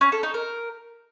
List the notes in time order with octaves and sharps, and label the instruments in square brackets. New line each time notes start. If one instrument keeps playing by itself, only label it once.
[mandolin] C#4
A4
D#4
A#4